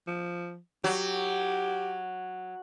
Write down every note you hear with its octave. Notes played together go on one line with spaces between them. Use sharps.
F3
F#3 G4